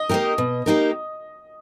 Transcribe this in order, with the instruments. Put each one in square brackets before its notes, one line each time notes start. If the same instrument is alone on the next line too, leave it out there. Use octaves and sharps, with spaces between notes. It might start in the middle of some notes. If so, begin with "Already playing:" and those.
Already playing: [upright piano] D#5
[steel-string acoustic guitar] A#3 D#4 G4 A#4
B2
A#3 D#4 G4 A#4